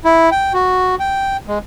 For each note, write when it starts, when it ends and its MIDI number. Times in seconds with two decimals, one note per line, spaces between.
0.05 0.30 64
0.31 0.53 79
0.53 0.95 66
1.00 1.37 79
1.48 1.59 56